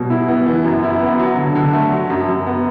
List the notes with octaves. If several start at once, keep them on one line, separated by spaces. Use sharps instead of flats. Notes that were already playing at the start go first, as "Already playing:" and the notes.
Already playing: B2 F#3 G3
E4
B3
E3
F#2
E4
B3
F#3
D3
D3
A3
F#3
F#2
F#2
B3